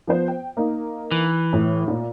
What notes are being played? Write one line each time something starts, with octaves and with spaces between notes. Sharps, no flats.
F3 B3 C5
G5
A#3 D#4
E3
A2
A#2